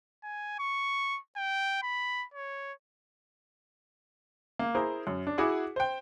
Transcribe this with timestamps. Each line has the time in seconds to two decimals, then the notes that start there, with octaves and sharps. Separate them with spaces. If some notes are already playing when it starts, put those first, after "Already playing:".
0.23 G#5
0.59 C#6
1.37 G5
1.82 B5
2.34 C#5
4.59 A#3
4.75 E4 G#4 A#4 C5
5.07 F#2
5.27 D4
5.38 E4 F#4 G#4 F#5 D6
5.76 C5 G5